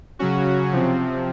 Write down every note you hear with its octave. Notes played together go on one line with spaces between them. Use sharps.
C#3 F#3 C#4 F#4
C3 F3 C4